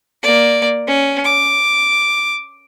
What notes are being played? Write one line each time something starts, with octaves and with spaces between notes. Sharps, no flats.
A#3 D5
C#4
D6